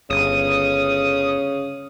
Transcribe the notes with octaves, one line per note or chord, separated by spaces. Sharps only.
G1 C#3 D#6